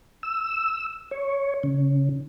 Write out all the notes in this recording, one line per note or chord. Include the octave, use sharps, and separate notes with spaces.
E6
C#5
C#3